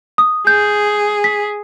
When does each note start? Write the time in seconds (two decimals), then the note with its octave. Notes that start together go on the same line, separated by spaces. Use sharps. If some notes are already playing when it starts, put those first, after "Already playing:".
0.18 D#6
0.47 G#4 G6
1.24 B6